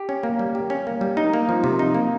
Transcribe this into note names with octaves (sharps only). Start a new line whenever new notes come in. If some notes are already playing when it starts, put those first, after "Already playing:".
Already playing: G4
C#4
A#3
G3
G4
C#4
A#3
G3
D#4
A#3
F3
C3
D#4
A#3